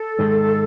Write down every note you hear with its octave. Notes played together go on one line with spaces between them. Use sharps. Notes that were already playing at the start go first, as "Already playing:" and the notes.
Already playing: A4
G#2 D#3 G#3